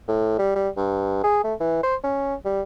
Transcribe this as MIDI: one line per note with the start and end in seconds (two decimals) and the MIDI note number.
0.08 0.38 45
0.39 0.51 55
0.56 0.69 55
0.77 1.23 43
1.24 1.41 68
1.44 1.54 57
1.60 1.80 52
1.83 1.95 72
2.04 2.35 61
2.45 2.62 55